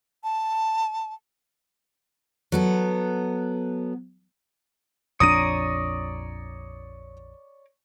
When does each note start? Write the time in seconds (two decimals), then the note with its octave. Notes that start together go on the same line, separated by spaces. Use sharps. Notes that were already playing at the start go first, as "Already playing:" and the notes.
0.24 A5
2.52 F#3 B3 A4
5.20 A#1 F2 D4 C#5 D5 A#5 D#6 D#7